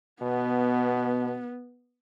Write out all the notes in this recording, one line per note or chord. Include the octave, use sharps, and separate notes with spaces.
B2 B3